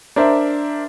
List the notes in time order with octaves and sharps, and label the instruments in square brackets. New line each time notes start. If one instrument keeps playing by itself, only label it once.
[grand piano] D4 A#4 C5 E5